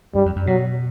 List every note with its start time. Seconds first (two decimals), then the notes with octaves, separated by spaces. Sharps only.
0.15 G2 G3
0.26 F2
0.36 F#2
0.47 B2 F#3